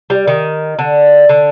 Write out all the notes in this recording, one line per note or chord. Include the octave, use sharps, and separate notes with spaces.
G3
D#3
D3
D3